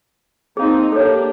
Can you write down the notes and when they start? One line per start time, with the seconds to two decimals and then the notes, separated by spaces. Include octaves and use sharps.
0.57 A#3 C4 D#4 G#4 F5
0.92 A#3 D4 G4 A4 C#5